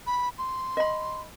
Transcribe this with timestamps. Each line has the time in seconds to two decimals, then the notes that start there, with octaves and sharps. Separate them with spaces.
0.07 B5
0.38 C6
0.77 D#5 B5